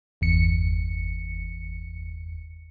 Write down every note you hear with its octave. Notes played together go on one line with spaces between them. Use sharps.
G1 E2 C#7